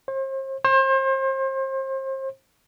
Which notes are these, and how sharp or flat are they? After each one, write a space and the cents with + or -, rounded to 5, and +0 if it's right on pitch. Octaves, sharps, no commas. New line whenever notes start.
C5 +40
C5 +35